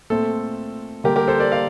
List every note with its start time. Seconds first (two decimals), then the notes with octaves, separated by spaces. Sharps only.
0.10 A#2 A3 C4 A4
1.04 D3 G3 A#3 G4 A#4
1.16 G4 A#4
1.28 A4 C5
1.39 A#4 D5
1.52 D5 F5